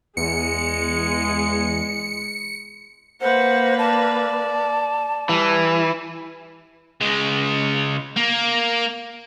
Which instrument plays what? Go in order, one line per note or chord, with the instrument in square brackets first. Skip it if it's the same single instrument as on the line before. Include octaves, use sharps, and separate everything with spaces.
[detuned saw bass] E2 [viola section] G#3 [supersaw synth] C#7
[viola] A#3 B4 [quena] C5 [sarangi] F#5
[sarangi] D5 [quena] A5
[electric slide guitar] E3 [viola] G3
[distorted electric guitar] C#2 G#3
A#3